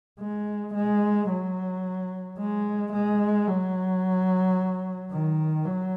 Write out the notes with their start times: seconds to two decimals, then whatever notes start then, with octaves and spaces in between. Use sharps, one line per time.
0.20 G#3
0.74 G#3
1.29 F#3
2.38 G#3
2.93 G#3
3.47 F#3
5.11 D#3
5.65 F#3